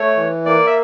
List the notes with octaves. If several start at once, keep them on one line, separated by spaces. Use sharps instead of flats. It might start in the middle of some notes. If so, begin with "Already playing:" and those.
Already playing: A3 C#5
E3
A#3 D5
E5